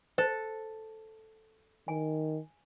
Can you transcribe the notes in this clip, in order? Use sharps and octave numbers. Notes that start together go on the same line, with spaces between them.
A4 C5
D#3 G#5